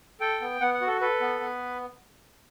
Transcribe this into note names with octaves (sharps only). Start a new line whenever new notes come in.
A4 G5
B3
B3 F#5
F#5
F#4
A4
A4 B4
B3
B3